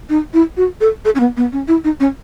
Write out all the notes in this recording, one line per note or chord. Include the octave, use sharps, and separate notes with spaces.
D#4
E4
F#4
A4
A4
C#4
B3
B3
C#4
E4
D#4
C#4